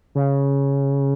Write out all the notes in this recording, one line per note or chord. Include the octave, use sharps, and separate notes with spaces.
C#3